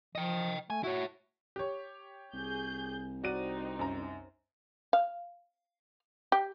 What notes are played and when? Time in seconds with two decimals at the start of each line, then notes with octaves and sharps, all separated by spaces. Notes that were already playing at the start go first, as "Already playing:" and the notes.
0.15 F3 D#5 G5
0.70 A3 G#5
0.83 E4 F#4 C#5
1.56 G4 C#5
2.34 C2 G#4 G6
3.24 C4 D#4 F#4 D5 D#7
3.79 F#2 A#5
4.93 F5
6.32 G4